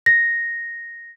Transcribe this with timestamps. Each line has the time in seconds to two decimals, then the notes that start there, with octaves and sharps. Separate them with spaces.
0.06 A#6